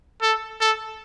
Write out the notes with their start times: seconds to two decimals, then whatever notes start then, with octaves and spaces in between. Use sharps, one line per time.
0.22 A4
0.61 A4